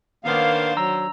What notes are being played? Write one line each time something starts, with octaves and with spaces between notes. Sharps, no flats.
D#3 A#3 B3 D4 C5 F5
F#3 A#5 E6